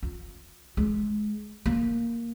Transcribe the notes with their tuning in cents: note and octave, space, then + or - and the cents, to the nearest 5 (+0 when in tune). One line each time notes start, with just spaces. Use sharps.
F4 +30
G#3 +20
A#3 +0